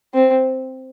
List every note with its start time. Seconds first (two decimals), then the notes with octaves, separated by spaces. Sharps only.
0.14 C4